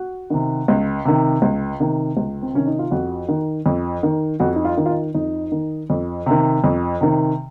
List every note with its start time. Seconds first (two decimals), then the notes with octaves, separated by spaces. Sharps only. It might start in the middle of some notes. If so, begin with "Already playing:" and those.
Already playing: F#4
0.30 C3 D#3
0.68 C#2
1.05 C3 D#3
1.42 C#2
1.80 C3 D#3
2.17 C#2
2.42 C4
2.54 C3 D#3 C#4
2.67 D#4
2.79 F4
2.91 F2 F#4
3.29 D#3
3.66 F2
4.03 D#3
4.40 F2 F#4
4.56 D#4
4.65 F4
4.77 D#3
4.86 F4
4.90 D#4
5.14 F2 D#4
5.52 D#3
5.90 F2
6.26 C3 D#3
6.64 F2
7.01 C3 D#3